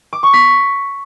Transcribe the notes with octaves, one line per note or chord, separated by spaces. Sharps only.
D6
C#6
B6